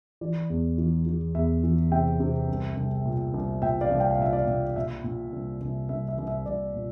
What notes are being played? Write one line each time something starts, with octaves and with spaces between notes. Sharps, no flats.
E3 D5
E2
E3
E3
E2 E5
E3
C3 E5 G5
C3
C2
C2
A#2
C2
A#2 E5 G5
D5 F5
C2
G5
F5
A#2 E5
D5 F5
A#2
A#2 E5
A#2
C2
C2
C2 E5
E5
C2
E5
C2 D5
A#2